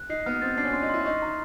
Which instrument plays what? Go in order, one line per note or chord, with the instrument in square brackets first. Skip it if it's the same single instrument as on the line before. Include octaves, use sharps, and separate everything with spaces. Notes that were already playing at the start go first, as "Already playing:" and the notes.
Already playing: [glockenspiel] F#6
[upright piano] D#4 [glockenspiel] C7
[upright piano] B3 [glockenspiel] F6
[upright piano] C4 [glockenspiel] A6
[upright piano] D4 [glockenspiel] C7
[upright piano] C#4
[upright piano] D4 [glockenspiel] C6
[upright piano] D#4
[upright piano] E4 [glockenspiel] C6
[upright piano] D#4 [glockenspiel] C#6
[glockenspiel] A#5